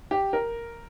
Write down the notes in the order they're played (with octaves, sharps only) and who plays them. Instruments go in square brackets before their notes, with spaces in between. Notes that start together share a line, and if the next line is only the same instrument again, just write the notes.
[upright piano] G4
A#4